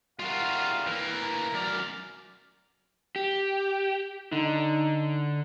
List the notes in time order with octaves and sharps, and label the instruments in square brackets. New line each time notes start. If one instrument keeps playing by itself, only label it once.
[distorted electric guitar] G3 A#4 [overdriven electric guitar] F4 F#4 [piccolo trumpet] F5
[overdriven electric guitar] E3 A#3 [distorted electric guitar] A#4
[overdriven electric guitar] F#2 D5 [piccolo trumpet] F6
[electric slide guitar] G4
[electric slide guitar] D3 [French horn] D#4